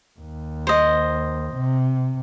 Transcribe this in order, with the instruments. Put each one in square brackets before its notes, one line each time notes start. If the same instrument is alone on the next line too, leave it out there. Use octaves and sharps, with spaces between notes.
[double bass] D#2
[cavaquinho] C5 D#5
[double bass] C3